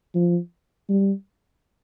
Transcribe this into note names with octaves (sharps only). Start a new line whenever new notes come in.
F3
G3